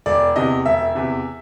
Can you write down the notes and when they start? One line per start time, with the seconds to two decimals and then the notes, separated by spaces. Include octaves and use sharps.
0.06 E1 D5
0.36 E2 C3 D#5
0.65 E1 E5
0.95 E2 C3